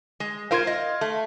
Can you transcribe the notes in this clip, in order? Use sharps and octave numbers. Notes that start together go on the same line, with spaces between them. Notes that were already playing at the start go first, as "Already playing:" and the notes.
G#3
F4 A#4 C5 F5 C6 G#6
D#5
A3